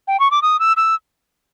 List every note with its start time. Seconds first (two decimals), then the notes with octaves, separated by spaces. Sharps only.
0.08 G5
0.20 C#6
0.31 D6
0.42 D#6
0.59 E6
0.77 E6